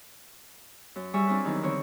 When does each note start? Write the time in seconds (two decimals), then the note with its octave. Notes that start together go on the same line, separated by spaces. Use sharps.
0.96 F#2
1.13 G3 G#4 E5 G#5 C#6 E6
1.27 C4 D4 F4 G#4 B4
1.45 E2 D#3 F#3 D#4
1.62 D3 E3 C4 C#5